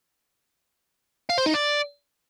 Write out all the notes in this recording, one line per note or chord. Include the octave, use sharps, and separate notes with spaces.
F5
C5
D#4
D5